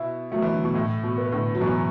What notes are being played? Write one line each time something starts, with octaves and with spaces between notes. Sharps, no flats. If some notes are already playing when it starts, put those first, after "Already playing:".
Already playing: B2 E4
F#3 A3
E3
D3
B2
A2 E4
B2
B3
A2 D3
F#3
F#2 B2 E3